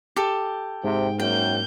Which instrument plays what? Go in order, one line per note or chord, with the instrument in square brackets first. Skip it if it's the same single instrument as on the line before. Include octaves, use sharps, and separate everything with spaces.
[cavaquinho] G4 A4
[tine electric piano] G#2 [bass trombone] C3 [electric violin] G5
[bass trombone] F#2 [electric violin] A#3 G6 [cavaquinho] G5